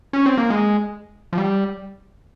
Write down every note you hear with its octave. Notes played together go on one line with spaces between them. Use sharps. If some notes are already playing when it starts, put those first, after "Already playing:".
C#4
C4
A#3
G#3
F3
G3